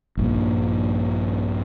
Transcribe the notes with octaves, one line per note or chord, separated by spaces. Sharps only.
A#1 G2 A#2